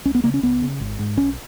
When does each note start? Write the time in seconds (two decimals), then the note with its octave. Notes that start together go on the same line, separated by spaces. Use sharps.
0.05 C#2 C#4
0.15 B3
0.24 C#3 A#3
0.34 C#4
0.43 C#2 B3
0.62 C#3
0.80 G#1
0.99 G#2
1.17 B1 C#4